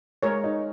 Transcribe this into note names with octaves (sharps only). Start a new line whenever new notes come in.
G#3 A#4 C#5
D#4